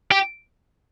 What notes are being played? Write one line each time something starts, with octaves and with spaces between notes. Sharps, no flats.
G4